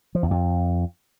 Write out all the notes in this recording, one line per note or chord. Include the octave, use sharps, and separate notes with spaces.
F3
E2
F2